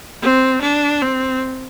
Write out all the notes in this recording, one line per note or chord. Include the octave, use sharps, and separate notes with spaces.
C4
D4
C4